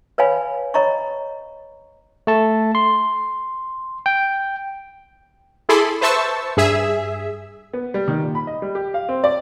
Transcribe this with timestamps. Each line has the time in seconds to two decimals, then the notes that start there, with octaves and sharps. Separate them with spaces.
0.18 B4 C#5 F5 G#5 B5
0.74 C#5 D#5 A#5 B5 C#6
2.27 A3 A5
2.75 C6
4.06 G5
5.69 E4 G#4 A4 B5 C6 D6
6.01 B4 C5 E5 A5 C#6 E6
6.57 G2 G#4 E5
7.73 B3
7.94 G3
8.08 D#3
8.22 A#2
8.35 B5
8.47 D#5
8.62 G3
8.75 G4
8.94 F5
9.09 C4
9.24 D5